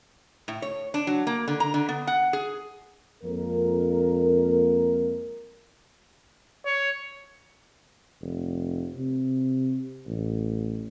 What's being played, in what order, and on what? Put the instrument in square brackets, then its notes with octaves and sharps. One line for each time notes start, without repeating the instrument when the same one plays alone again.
[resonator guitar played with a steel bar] A2
C#5
D4
F#3
A#3
D3
A#5
D3
B3
F#5
G#4
[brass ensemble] F2 G#3 A#3 A#4
[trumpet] C#5
[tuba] F1
C3
A1